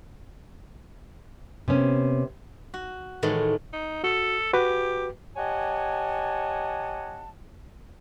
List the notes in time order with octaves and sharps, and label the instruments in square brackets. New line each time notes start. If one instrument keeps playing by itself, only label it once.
[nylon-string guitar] C3 B3 C#4
[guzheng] F#4
A2 D#3 E3 G#3 A3
[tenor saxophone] D#4
[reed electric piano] F#4 [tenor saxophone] A4
[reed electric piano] F#4 B4 [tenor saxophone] G4
[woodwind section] G4 C#5 D#5 F#5 G#5 A5